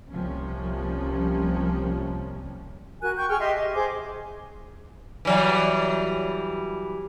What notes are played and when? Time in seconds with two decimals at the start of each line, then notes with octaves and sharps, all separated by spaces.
0.10 C2 C3 F3 G3 A#3 C#4
3.01 F#4 A#4 G#5 F#6
3.16 G5 C#6 G6
3.28 G#4 G5 C#6 F6
3.40 G4 D#5 E5 C6
3.57 D#5
3.73 G#4 C5 C6 D6
5.25 E3 F#3 G3